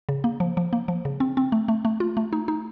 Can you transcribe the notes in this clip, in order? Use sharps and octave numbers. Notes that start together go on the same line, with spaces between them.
C#3
A#3
F3
F3
A#3
F3
C#3
C4
C4
A3
A3
A3
F4
A3
D#4
D#4